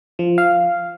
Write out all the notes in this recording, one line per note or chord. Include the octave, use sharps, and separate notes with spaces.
F3
F5